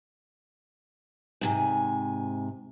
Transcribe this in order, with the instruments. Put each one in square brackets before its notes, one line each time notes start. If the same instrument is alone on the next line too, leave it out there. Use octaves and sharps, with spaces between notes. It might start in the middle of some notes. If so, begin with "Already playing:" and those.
[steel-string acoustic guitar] G#2 C3 G#5